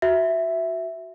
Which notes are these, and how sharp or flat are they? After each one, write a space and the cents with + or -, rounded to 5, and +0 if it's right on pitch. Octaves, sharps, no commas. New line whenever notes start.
F#4 +0 E5 +0